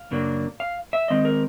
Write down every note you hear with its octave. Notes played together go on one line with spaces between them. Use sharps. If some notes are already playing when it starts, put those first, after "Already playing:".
Already playing: F5
F#2 C#3 F#3 A#3 D4
F5
E5
C3 D#3 G#3 C4 D#5
A#4